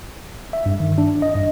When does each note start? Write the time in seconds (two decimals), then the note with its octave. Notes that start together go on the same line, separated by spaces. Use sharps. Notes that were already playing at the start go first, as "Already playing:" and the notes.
0.53 E5
0.66 G2
0.80 D#3
0.98 D4
1.22 D#5
1.35 G2